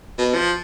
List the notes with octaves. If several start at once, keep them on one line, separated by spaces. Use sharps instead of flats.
B2
F3